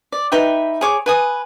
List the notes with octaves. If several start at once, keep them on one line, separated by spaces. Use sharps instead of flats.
D5
D#4 B4 E5 G5
G#4 C#5 D6
B4 G#5 D#6